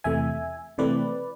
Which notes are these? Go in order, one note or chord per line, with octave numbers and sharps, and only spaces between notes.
E2 C3 E3 A3 E5 G#5
C3 E3 A3 C4 B4 D5